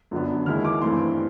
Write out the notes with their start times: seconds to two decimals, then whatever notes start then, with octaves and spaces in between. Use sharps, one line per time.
0.11 F#2 D3 F#3 B3 D4
0.46 D#2 D#3 G#3 B3 E4 F6
0.65 D6
0.82 G2 E3 A3 C4 E4 C6